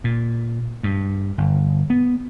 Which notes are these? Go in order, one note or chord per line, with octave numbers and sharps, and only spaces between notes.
A#2
G2
G1
B3